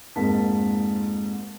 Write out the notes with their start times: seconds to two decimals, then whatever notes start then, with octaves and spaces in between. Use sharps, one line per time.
0.16 F2 G#2 A#3 D#4 A5 B6